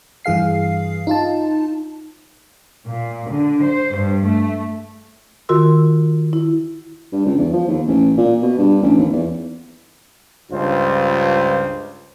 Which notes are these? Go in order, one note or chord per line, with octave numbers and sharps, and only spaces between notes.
G2 E3 G#4 F5 C7
D#4 F4 A5
A#2
D3
C5
G2
A3
D#3 F4 F#4 A#4 C6 E6
E4
G2
C#2
E2
F3
D#2
A1
A#2
B2
G2
A1
D#2
E2
C#2 G2 F4 C5